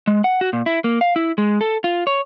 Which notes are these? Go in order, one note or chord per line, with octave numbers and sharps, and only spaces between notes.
G#3
F#5
F#4
A#2
E4
A#3
F5
E4
G#3
A4
F4
C#5